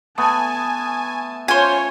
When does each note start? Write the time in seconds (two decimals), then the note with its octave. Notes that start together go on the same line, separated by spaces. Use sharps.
0.18 A3 B3 G#5 A5
1.48 C#4 F4 C5 C#5 G#5